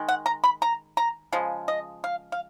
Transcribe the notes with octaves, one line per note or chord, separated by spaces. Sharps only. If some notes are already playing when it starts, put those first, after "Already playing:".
Already playing: D#3 G#3
F#5
A#5
B5
A#5
A#5
C#3 F3 G#3
D#5
F5
F5